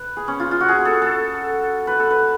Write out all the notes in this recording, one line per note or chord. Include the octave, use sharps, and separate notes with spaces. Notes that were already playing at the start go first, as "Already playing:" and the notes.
Already playing: B4
G#4
C#4
F4
F4
F#4
G#4
A4
A4
B4
A4
B4